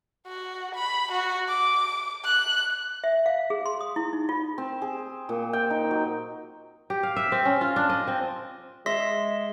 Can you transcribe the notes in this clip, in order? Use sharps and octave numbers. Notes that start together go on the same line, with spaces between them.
F#4
B5
F#4
D6
F#6
E5
F5
G#4
C6
D#6
E4
D#4
F4
C4
G#4
A#2
G5
D#4
F#3
G4
F5
E5
C4
C#4
F4
D4
D#5
C4
G#3 E5 C6 A#6 B6